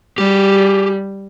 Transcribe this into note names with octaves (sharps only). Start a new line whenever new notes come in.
G3 G4 G#4